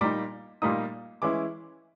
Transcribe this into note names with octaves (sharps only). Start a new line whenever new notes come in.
A#2 G3 A#3 D#4 D6
A#2 G3 A#3 D#4 D#6
E3 G#3 C#4 E4 D6